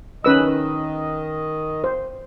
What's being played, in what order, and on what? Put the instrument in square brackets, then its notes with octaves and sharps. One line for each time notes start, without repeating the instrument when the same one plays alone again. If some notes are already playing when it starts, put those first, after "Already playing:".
[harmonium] D#3 D#5 [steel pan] C#4 B4 E6
[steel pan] C5